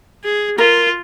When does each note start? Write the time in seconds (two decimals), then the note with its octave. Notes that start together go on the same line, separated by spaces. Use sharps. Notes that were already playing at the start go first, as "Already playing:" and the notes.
0.24 G#4
0.58 F4 A#4